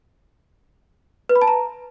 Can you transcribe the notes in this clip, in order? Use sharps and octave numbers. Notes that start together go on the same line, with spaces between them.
B4
B5
A5
A#5